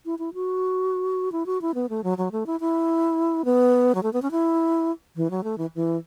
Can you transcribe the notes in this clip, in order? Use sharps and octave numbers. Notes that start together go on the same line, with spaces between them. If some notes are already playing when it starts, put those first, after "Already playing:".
E4
E4
F#4
E4
F#4
E4
B3
A3
F#3
F#3
A3
E4
E4
B3
F#3
A3
B3
C#4
E4
E3
F#3
A3
E3
E3